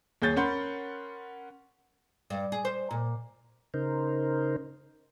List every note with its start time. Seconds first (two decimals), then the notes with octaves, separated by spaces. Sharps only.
0.22 D#2 G#4 C#5 G6 A6
0.36 C#4 A#4 F#5 B5 C6 G6
2.30 G2
2.52 G#4
2.65 C5
2.91 A#2
3.74 C#3 D#4 A#4 C5